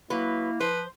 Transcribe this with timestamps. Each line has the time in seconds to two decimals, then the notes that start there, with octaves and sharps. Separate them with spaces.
0.10 F#3 A#3 E4 B4
0.60 F3 B4 C5